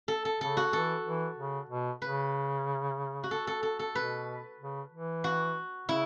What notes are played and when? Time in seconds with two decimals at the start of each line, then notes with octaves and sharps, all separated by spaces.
0.08 A4
0.25 A4
0.40 C#3 A4
0.57 F#4
0.73 E3 A4
1.06 E3
1.37 C#3
1.69 B2
2.02 C#3 B4
3.24 F#4
3.31 A4
3.47 A4
3.63 A4
3.79 A4
3.95 B2 B4
4.59 C#3
4.92 E3
5.24 F#4
5.88 C#3 E4